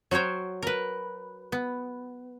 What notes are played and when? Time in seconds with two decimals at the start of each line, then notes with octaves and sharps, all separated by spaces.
0.11 F#3 F#4 C5 C#5 G5
0.63 A#4 B4
1.52 B3